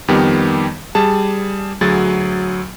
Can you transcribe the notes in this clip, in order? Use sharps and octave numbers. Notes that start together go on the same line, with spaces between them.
F2 D#3 G3 B3 G4
G3 G#4 A5
D2 F#3 G#4 A6